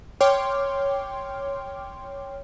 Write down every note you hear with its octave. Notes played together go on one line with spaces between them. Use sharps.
C#5 G5 C6 D6 F6